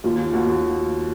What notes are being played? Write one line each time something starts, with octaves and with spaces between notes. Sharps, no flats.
D#2 F4
D#2 F#4